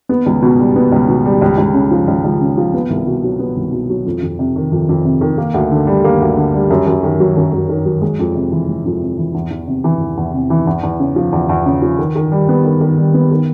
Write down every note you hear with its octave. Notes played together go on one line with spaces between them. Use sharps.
B3
C#2
B2
G3
B3
C#2
B2
G3
C#2
C#2
C#3
F3
C#2
C#2
C#3
F3
B3
C2
B2
F#3
B3
C2
B2
F#3
F2
F2
C3
D#3
F2
F2
C3
D#3
A#3
D2
D3
G3
A#3
D2
D3
G3
F#2
F#2
D#3
F#3
F#2
F#2
D#3
F#3
G#3
F2
C3
E3
G#3
F2
C3
E3
E2
E2
C3
E3
E2
E2
C3
E3
E2
E2
C#3
F3
E2
E2
C#3
F3
D#3
D#3
G3
B3
D#3
D#3
G3
B3
D#3